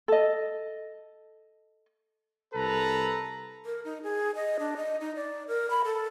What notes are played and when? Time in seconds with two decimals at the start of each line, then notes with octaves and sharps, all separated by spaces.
0.08 A4 D#5
2.54 C2 A4 B4 A#5
3.65 A#4
3.84 D#4
4.03 G#4
4.35 D#5
4.59 D4
4.77 D#5
5.00 D#4
5.16 D5
5.48 A#4
5.70 B5
5.85 A4